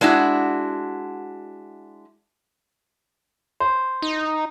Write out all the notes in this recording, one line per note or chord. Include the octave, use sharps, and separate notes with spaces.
G#3 D4 E4 F#4
C5
D#4